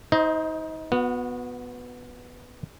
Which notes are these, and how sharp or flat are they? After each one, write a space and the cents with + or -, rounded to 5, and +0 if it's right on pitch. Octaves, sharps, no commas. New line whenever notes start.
D#4 +30 C5 -5 D#5 +0
B3 +0 F#4 -35